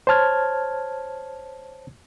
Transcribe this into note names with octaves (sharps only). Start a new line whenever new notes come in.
C5 C#5 A5 F6 G#6